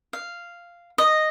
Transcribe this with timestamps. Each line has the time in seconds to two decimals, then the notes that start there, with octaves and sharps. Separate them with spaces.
0.13 F5
0.98 D#5